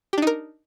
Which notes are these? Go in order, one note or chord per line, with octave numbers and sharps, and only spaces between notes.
D4 D#4 G4 A#4